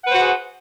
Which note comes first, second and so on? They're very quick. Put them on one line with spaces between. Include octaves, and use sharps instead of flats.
F#5 B4 C5 F#4 G#4